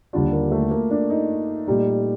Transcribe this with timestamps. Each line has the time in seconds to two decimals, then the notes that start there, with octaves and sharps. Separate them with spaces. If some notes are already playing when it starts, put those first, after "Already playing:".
0.13 D#2 D3 G3 D4 F4
0.33 A#3
0.52 A3
0.71 A#3
0.90 D4
1.10 D#4
1.67 A#2 G3 A3 D#4